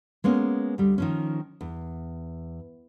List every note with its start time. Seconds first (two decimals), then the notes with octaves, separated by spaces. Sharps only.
0.24 G#3 A#3 B3 C#4
0.78 D2 G3
0.98 D#3 F3 C#4
1.61 E2